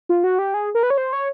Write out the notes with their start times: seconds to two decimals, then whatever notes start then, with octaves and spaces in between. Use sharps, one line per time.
0.09 F4
0.24 F#4
0.39 G4
0.54 G#4
0.75 A#4
0.83 B4
0.90 C#5
0.98 C5
1.13 C#5